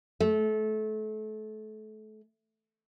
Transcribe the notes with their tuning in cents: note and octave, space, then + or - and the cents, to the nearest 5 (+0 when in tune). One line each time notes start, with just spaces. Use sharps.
A3 -30